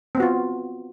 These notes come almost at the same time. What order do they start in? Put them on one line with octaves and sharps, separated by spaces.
C4 B3 F#4 F4